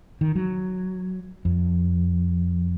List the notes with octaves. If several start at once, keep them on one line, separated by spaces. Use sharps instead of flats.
D#3
F#3
F2